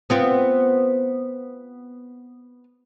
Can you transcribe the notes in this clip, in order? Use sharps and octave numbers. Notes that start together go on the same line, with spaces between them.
B3 C4 F4